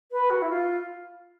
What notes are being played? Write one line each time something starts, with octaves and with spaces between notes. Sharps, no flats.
B4
F#4
E4
F4